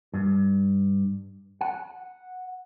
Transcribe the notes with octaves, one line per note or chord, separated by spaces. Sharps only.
G2
F#5